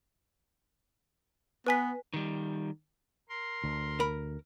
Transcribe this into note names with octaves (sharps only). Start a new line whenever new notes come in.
B3 B4 G#5 B6
D#3 G3
A#4 C6
D2
A#4 B5